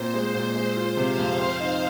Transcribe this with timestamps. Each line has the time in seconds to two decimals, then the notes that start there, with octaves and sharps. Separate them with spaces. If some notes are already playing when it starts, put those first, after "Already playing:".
Already playing: A#2 C4 C5
0.14 G#3
0.34 A#2
0.56 G#3
0.76 F4
0.96 C3 F5
1.18 F2
1.39 C4
1.60 D#4